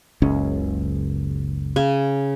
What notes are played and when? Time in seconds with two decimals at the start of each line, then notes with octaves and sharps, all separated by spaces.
0.22 F#1 C#2 C#4
1.76 C#3 G#5